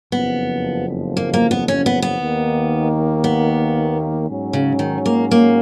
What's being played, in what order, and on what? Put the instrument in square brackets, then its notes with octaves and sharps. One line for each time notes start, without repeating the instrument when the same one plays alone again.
[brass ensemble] F#1 F2 F3 [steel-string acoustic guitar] B3
[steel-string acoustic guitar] A#3
A#3
B3
C#4
B3
B3
[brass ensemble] D#2 D#3 A#3
[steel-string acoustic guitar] B3
[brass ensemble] G#2 F#3 C#4
[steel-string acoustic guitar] C#3
D#3
A#3
A#3